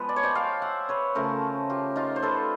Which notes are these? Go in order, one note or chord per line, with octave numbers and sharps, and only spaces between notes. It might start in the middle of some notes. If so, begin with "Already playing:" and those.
Already playing: F3 G#3 B3 B4
D5
C#5
C5 D5
F5 G5
E5 F#5
B4 C#5
C#3 F3 A3 A#4 C5
F4 G4
D#4 F4
C5
A4 B4